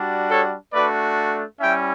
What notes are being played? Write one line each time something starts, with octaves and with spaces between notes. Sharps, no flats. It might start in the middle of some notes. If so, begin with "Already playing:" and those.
Already playing: G3 D4 F#4
A4 C#5
A3 D4 F#4 B4 D5
G3 C#4 E4 E5 G5